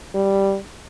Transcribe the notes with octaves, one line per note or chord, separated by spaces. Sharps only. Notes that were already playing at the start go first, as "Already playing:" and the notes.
G3